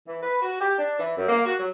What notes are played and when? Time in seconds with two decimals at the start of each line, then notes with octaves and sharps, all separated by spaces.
0.06 E3
0.22 B4
0.42 F#4
0.60 G4
0.78 D4
0.99 E3
1.16 F#2
1.28 A#3
1.45 F#4
1.58 F#3